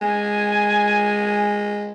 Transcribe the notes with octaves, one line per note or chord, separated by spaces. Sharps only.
G#3 G#5